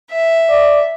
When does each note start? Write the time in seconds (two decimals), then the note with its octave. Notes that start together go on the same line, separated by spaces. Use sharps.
0.10 E5
0.50 D5